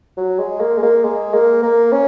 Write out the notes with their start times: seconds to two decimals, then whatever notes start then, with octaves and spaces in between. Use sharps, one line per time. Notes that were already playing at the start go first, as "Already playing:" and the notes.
0.17 F#3
0.39 G#3
0.60 A#3
0.78 G#3
0.83 A#3
1.04 G#3
1.34 A#3
1.63 A#3
1.92 C#4